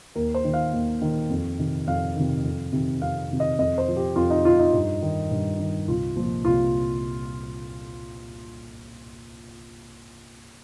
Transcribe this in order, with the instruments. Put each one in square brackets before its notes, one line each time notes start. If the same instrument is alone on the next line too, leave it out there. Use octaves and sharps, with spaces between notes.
[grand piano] D#2 A#4
C5
D#3
F5
D#2
D#3
F2
C3 D#3
F2 F5
C3 D#3
F2
C3 D#3
F2 F5
C3 D#3
D#5
F2 D#5
C5
F3
G4
F2 F4
D#4
F3 F4
D#4
G2
D#3
G2
D#3
C2 F4
A#2 F3
C2 F4